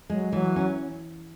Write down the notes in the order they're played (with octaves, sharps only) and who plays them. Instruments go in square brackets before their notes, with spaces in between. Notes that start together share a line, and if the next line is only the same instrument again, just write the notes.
[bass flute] F#3 [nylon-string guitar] G#3
[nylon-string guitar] E3 [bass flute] F#3
[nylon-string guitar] C#4